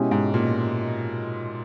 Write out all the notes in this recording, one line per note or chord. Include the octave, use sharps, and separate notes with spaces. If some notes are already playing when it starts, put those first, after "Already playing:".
Already playing: B2 G#3 C#4 E4 G4
G#2
A#2